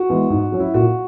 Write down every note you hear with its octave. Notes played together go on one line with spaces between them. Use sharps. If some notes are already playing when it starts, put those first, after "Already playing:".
Already playing: F#4
E3 G#3 B3
G#2
F#3 C#4
E4
A#2 F#4